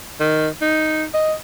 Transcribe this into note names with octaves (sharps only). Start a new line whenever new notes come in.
D#3
D#4
D#5